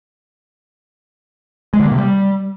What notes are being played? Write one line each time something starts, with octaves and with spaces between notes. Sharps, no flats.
G#3
D3
A#3
C3
G3